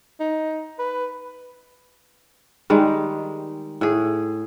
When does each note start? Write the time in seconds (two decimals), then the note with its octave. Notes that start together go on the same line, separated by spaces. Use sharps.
0.20 D#4
0.79 B4
2.70 D#3 G3 G#3
3.81 A2 G#4